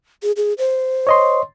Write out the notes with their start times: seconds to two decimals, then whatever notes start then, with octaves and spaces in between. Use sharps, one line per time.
0.23 G#4
0.37 G#4
0.58 C5
1.07 C#5 D#5 C6